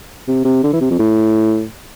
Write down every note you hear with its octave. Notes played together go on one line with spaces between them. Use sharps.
C3
C3
D3
E3
C3
F2
A2